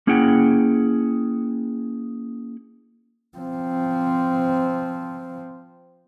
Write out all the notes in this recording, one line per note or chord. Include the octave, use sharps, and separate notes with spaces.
A#3 C#4 E4 G#4 F#5 G5
F3 C4